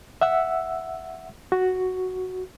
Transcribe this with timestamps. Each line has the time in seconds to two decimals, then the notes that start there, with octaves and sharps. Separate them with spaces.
0.21 E5 F#5 E6
1.52 F#4